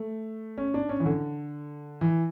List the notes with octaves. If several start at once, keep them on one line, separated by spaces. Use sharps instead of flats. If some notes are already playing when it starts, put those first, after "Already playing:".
Already playing: A3
C#4
D4
C#4
E3
D3
E3